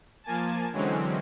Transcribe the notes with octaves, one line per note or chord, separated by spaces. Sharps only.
F3 A#3 G#5 A5
D3 E3 F#3 G#3 C4 C#4